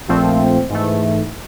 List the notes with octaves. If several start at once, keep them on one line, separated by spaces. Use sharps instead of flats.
A#1 A#2 F3 A3 C4
G#2 E3 A3